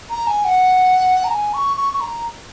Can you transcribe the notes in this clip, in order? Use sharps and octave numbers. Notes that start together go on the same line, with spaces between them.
A#5
G#5
F#5
A#5
G#5
C#6
C#6
C#6
A#5